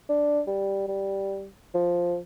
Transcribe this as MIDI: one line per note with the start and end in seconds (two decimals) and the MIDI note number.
0.09 0.41 62
0.47 0.84 55
0.88 1.48 55
1.74 2.17 53